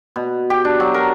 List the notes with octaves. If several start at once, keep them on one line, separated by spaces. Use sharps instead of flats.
B2
G4
D4
F#3
A#4